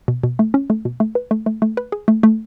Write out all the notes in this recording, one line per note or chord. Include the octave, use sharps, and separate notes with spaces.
B2
B2
A3
C#4
A3
B2
A3
B4
A3
A3
A3
B4
G#4
A3
A3